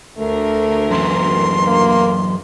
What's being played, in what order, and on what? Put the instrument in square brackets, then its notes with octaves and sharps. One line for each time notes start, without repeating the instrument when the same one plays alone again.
[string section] D2 A#4 [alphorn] A3
[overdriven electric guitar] F#2 E3 [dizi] C6
[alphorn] A#3